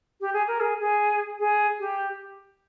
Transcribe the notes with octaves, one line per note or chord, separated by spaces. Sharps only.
G4
G#4
A#4
G#4
G#4
G#4
G4